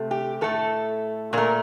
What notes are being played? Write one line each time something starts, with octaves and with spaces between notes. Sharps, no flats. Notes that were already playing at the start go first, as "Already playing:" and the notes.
Already playing: C3 A3
G4
A2 A3 A4
A#2 A3 A#4